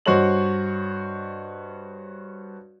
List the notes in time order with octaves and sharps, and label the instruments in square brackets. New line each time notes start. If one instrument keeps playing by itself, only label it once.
[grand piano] G2 F#4 C5 C#5 D#5 F#7